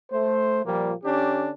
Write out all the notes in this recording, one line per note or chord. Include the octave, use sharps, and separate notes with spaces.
A3 C5
A#2 F3 G3 A#3
D3 C#4 D4 G4